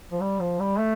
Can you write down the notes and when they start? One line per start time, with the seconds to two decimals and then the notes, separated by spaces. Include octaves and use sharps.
0.12 F3
0.20 G3
0.41 F3
0.59 G3
0.79 A3